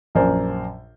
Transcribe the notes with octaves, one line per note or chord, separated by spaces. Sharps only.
A#1 F#2 A#4 C5 D5 G#5